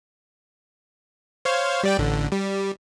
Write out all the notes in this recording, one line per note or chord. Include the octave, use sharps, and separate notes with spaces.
C5 C#5 F5
G3 D5 G5
A1 D3
G3